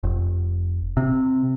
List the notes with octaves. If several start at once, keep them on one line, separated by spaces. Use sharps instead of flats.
F1
C3